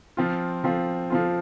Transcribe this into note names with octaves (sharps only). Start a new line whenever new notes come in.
F3 C4 F4
F3 C4 F4
F3 C4 F4